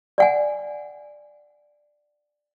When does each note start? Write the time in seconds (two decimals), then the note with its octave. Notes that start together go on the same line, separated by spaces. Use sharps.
0.18 D5 F#5 G#5